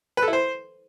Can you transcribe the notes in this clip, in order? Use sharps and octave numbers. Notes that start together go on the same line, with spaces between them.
B4
A4
E4
C5